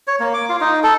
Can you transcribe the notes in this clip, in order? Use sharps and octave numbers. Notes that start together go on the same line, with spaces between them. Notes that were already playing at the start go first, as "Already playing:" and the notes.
C#5
A#3
D6
F4
D#4
A4